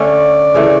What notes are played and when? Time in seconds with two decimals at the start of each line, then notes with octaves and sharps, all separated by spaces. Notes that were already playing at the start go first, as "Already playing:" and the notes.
Already playing: D3 A3 C#4 D5
0.54 C#3 E3 A3